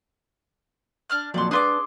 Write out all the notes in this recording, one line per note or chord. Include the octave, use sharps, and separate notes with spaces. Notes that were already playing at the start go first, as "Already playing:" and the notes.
D4 F6 F#6
F2 A#2 F#3 D5 C6
D4 G#4 B4 D5 C6 D6